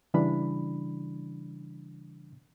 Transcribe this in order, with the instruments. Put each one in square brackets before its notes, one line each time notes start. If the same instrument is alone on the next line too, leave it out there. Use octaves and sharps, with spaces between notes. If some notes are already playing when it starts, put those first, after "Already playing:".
[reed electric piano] C#3 E3 G3 D4 B5